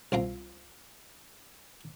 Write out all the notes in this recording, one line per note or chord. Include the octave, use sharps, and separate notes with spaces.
C2 C4 F4 A#5